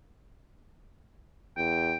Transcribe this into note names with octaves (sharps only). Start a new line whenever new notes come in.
E2 G5